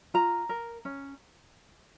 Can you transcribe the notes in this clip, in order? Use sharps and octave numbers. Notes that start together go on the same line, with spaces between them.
F4 A#5
A#4
C#4